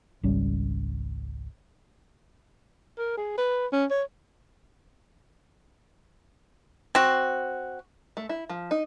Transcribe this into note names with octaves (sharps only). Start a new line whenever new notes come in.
G#1 C#2 G3 C#4
A#4
G#4
B4
C#4
C#5
C4 F#4
A3
E4
F3
D#4